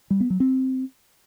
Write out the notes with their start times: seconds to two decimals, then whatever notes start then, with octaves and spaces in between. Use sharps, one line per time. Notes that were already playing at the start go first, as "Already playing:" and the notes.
0.10 G3
0.20 B3
0.30 F#3
0.40 C4